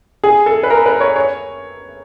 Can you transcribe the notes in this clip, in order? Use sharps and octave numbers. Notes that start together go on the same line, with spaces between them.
G#4
A4
B4
A#4
B4
C#5
C#5